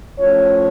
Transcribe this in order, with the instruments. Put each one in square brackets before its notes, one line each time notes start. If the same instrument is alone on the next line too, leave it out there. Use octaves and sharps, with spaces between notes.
[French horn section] A2 F3 C#4 C#5